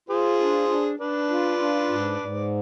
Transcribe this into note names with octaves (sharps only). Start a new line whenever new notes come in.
F4 G#4 C5
D4
D4
D4 B4 D5
F4
D4
G#2
G#2